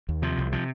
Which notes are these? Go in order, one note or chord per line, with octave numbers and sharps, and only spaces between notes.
D#2
C3 F3
C2
C3 F3